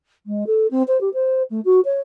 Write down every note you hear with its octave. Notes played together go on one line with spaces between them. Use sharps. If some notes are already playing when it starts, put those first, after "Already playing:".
G#3
A4
C4
C5
G4
C5
A3
F#4
C#5